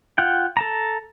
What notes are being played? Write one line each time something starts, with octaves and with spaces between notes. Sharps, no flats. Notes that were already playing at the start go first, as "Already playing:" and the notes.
F4 F#5 G5
A4 A5 A#5